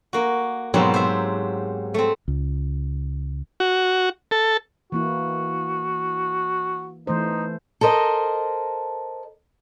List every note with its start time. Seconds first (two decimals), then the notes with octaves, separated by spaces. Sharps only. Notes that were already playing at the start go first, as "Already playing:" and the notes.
0.13 A#3 F#4
0.74 G#2 B2 F#3 A#3 C4 G4
0.94 C5 E5
1.94 A3 C4
2.28 C#2
3.60 F#4
4.31 A4
4.92 E3 A#3 E4 F#4
7.07 E3 A3 D#4 C5
7.81 A4 A#4 C5 D#5